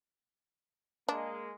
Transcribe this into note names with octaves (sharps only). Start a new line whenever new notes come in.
G#3 A#3 D4